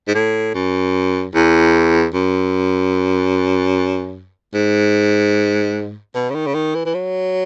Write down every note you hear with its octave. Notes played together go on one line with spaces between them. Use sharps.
G#2
A2
F#2
E2
F#2
G#2
B2
C#3
D#3
C#3
D#3
E3
E3
F#3